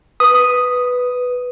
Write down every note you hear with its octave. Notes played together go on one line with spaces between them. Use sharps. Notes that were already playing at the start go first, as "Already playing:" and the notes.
B4 D#6